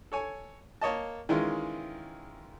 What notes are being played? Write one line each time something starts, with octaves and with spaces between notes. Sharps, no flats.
A4 C#5 G#5
A#3 C#5 D#5 A5
D#3 E3 G#3 C#4 E4 F4